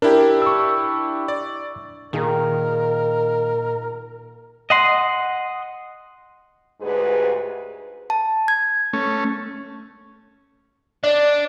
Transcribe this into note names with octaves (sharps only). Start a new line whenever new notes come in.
D4 E4 G4 A#4
C#6 E6
D5
A#2 D#3 D#4 G#4 A#4
D#5 F#5 C6
D2 G#2 G4 G#4 B4
A5
G#6
A3 C#4
D4